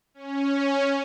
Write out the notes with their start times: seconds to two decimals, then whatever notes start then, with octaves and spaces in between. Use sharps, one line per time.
0.14 C#4